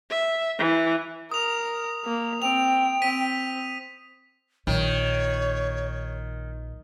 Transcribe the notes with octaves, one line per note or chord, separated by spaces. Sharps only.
E5
E3
A#4 D#6 F7
A#3
C4 G5 F7
C4 B6 D#7
A#1 D#3 C#5